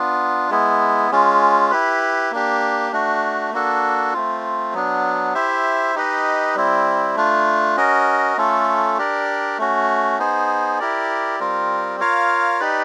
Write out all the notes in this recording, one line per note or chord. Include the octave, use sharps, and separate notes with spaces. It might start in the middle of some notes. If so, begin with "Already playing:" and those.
Already playing: B3 D4 F4
G#3 B3 E4
G#3 C#4 F4
E4 G4 B4
A#3 D4 G4
A3 D4 F#4
A#3 D4 F#4 A4
A3 C4 F4
F#3 B3 D4
E4 G4 C5 E5
D#4 G4 B4 D#5
G3 C4 E4
A3 D4 F4
C#4 F#4 A#4 D#5
A3 C#4 F4 A4
D4 G4 A#4 D5
A3 C#4 F#4
B3 D#4 G#4 C5
E4 G4 A#4 D5
G3 C4 F4 A#4
F4 A#4 C#5 F5
D#4 G4 B4 D5